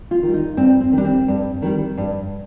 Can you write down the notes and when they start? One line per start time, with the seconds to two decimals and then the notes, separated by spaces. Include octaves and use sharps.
0.11 F4
0.23 D#3 G3
0.34 D#4
0.57 G2 C4
0.80 C4
0.92 D#3
0.97 G3 D4
1.04 C4
1.28 G2
1.62 D#3 G3
1.97 G2